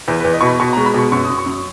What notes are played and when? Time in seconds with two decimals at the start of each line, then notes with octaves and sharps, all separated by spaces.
0.08 E2 B4
0.20 E2 B4
0.33 D#5
0.41 B2 C#6
0.47 B5
0.60 B2 C#6
0.73 G#3 A#5
0.86 B5
0.94 B2 C#6
1.12 F#2 C#6
1.25 F#2 D#6
1.38 C#6
1.46 F#2